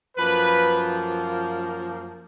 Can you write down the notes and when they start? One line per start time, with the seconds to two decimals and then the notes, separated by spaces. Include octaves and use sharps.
0.17 F#2 F3 A#3 B4